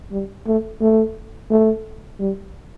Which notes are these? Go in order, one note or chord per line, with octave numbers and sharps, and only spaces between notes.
G3
A3
A3
A3
G3